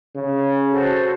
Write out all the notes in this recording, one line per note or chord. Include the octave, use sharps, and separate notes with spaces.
C#3
F#4 A4 C5